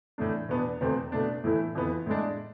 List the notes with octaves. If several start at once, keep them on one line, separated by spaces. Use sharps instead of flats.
A2 E3 A3 D4
E2 B2 B3 D4
E2 B2 A3 C4
B2 A3 D4
A2 E3 A3 E4
F2 E3 B3
A2 G#3 D4